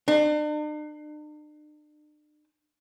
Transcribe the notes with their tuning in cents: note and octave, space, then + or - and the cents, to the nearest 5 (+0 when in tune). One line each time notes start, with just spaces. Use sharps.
D4 +45